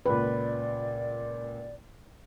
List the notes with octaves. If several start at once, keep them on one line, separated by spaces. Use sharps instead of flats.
C#2 A#2 B4 D5